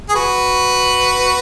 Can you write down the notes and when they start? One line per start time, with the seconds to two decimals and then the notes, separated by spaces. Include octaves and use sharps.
0.09 G#4
0.15 F#4 B4